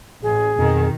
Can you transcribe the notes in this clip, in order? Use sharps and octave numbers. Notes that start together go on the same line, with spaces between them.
A1 G#4
F2 B2 D#3